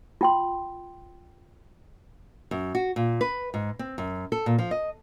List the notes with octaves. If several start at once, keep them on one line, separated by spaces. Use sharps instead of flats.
F4 G5 C6
F#2
F#4
A#2
B4
G#2
C4
F#2
A4
A#2
F3
D#5